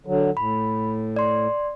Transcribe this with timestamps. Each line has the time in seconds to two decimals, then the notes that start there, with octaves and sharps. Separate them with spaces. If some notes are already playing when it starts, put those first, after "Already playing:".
0.06 D3 F#3
0.37 A2 B5
1.16 D5 C6